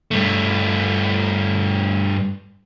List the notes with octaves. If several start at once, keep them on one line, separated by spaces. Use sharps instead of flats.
G2 A3